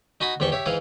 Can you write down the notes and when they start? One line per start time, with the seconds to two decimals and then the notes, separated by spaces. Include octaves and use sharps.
0.21 D#4 F#4 G#5 B5 D#6
0.40 E2 G#2 G4 C5 C#6
0.52 G4 C#5 E5
0.66 G#2 E3 G#4 F5